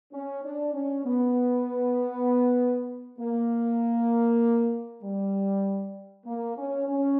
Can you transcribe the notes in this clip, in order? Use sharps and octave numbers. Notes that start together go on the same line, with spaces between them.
C#4
D4
C#4
B3
A#3
G3
A#3
C#4
C#4